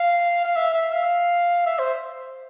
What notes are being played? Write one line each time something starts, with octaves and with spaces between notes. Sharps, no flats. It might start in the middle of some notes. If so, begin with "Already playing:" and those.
Already playing: F5
F5
E5
E5
F5
E5
C5